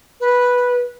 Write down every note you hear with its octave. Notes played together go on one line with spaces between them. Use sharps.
B4